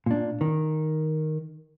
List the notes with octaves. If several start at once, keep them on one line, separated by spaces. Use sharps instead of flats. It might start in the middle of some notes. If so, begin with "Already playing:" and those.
A#2 D4
D#3